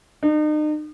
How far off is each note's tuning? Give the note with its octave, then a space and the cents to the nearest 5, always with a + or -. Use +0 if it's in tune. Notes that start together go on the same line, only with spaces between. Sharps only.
D#4 -40